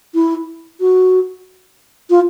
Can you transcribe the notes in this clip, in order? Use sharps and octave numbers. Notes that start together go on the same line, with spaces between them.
E4
F#4
F4